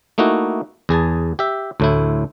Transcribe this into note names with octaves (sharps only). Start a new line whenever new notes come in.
A3 A#3 D#4 E4 F#4
E2 G#4 G#5 A5
G4 E5
D2 A2 E4